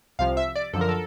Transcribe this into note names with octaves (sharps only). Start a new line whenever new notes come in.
C2 C3 F3 F5
E5
D5
F#2 D3 F3 A4
A#4
A4